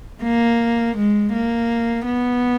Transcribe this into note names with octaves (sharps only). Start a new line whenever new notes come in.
A#3
G#3
A#3
B3